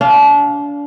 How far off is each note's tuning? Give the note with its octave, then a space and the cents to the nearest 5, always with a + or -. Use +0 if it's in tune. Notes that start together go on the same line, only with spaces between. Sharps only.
D4 -30 F5 -5